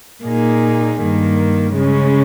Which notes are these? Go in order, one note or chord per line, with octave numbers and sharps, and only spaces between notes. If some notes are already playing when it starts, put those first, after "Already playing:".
A#2 A#3 D#4 G#4
G2 D#3 A#3
C#3 G#3 C#4